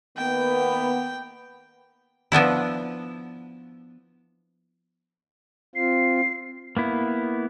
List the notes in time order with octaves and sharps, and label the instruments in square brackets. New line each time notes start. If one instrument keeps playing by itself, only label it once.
[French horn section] D#3 A#3 B3 [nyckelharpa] G5
[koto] F3 B3 D4 E4
[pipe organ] C4 F4 [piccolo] C7
[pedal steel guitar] A#3 B3 E4